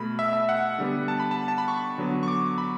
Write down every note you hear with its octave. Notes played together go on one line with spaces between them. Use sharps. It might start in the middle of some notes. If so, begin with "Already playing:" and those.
Already playing: B2 A3 B5
E5
E5
F#5
D3 G3 B3
A5
B5
A5
A5
B5
C#6
D3 F#3 B3
C#6
D6
B5